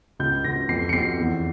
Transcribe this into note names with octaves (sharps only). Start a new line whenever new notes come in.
C#2 G6
C#2 A#6
F2 C7
C#7
F2 C7
E2